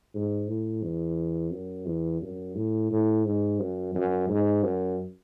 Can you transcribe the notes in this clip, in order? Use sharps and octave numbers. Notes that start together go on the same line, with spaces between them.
G#2
A2
E2
F#2
E2
F#2
A2
A2
G#2
F#2
F#2
G#2
F#2